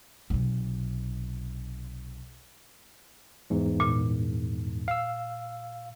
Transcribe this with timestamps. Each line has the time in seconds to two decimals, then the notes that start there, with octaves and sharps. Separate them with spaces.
0.30 B1 C3
3.50 E2 G#2
3.80 A#2
4.88 F5 E6